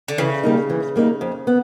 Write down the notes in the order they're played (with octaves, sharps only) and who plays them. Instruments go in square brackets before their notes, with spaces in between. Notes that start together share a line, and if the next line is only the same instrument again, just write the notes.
[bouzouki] D3
[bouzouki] C#3 [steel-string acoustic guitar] E3
[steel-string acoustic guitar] G3 A#3 D#4
E3
G3 A#3 D#4
F2
B3